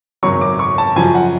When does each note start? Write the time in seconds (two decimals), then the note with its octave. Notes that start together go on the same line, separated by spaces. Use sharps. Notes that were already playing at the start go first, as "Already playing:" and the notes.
0.23 G#1 F#2 C#3 F#3 C#6
0.41 D6
0.59 C#6
0.78 A5
0.96 F#2 C#3 F3 G#5
1.15 F#5